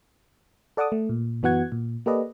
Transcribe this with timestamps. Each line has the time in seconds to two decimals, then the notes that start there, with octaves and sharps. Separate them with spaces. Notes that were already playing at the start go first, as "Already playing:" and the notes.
0.77 A4 D5 F#5 A5 D6 D#6
0.92 A3
1.09 A#2
1.42 F#2 E3 B3 F#4 F#5 G#6
1.72 A#2
2.06 A#3 G4 A4 B4 D5 D#5